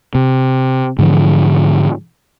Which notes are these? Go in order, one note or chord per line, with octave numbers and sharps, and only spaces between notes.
C3
G#2 D3 E3 F3